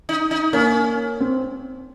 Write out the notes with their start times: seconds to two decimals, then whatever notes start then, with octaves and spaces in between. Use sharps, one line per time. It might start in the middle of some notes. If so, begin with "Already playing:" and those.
0.09 D#4
0.31 D#4
0.53 A#3 C#4
1.20 C4